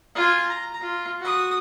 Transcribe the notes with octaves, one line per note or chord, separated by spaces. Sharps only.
F4 G#5
A#5
F4
F#4 D#6